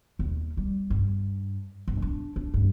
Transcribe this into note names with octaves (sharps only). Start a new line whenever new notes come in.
D#2
G3
G2
G2
D4
D4
G2